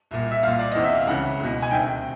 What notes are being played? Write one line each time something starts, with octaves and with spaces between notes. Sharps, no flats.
C2 A#2
E5
C2 A#2 F5
D5
E2 C3 E3 D#5
E5
F5
C#2 C#3 E3 F#5
C#2 B2
G#5
D2 C3 D#3 G5